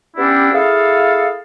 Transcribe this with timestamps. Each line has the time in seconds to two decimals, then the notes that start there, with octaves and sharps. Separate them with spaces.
0.16 B3 C#4 D4 E4 G4
0.54 E4 G#4 A4 F5